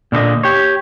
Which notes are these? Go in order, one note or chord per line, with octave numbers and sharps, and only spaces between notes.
A#2 D3 A4 D#5
G4 C#5